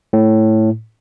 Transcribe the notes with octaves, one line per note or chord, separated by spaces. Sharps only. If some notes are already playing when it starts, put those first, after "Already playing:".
A2